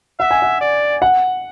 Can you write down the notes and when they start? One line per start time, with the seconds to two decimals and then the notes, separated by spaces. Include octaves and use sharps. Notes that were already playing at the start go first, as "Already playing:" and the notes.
0.20 E5 F#5
0.31 G#5
0.42 F#5
0.61 D5
1.02 F#5